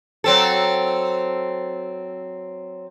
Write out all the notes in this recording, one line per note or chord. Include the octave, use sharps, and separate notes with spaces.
F#3 C4 A4